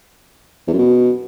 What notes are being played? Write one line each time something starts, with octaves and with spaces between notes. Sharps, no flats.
E2
F#2
B2